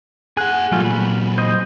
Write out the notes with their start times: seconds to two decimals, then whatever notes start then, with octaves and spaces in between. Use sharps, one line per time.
0.37 G#4 F#5 G#5 F#6
0.72 A#2 F#3 G3 A3 F4
0.85 B5
1.38 C5 D#5